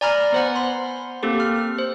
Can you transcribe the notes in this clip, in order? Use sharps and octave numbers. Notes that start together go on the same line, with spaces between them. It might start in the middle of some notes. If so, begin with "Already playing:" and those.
D5 G#5 A#5 B5 F6
B3 C5 F#5
B5 C6
A#3 C4 G4 A4
F6
C5